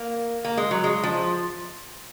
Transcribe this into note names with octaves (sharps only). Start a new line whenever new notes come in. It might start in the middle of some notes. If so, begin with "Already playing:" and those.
Already playing: A#3
A#3
G#3
F#3
G#3
F3